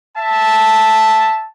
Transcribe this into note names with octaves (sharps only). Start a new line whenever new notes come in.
E5 A5